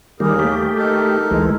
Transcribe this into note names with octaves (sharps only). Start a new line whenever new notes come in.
D#2 D#3 G3 A#3 G#4 A#4
A3 G4
D#4 A4 A#4
D2 E3 G#3